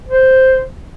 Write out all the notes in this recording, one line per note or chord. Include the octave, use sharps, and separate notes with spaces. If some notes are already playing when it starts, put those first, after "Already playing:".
C5